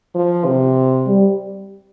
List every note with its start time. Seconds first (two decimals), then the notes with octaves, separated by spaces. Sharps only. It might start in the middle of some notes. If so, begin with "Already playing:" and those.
0.15 F3
0.45 C3
1.07 G3